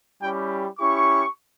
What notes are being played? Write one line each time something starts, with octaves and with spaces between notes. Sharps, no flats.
G3 C#4 E4 G4 G5
C#4 E4 G4 C#6